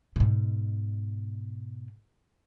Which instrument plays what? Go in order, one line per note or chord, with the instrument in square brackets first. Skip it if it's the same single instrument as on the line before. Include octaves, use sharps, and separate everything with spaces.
[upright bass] G#2 B2